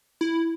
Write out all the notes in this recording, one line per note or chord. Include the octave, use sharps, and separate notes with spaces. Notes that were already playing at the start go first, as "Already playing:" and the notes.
E4